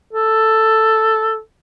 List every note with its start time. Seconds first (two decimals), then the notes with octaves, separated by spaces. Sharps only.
0.13 A4